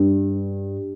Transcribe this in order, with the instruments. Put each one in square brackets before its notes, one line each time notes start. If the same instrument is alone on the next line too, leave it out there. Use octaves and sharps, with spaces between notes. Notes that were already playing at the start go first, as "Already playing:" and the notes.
Already playing: [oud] G2